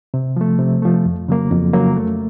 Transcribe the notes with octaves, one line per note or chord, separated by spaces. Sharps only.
C3
F3 A3
C3
F3 A3
F2
C#3 F#3 A#3
F2
C#3 F#3 A#3
A3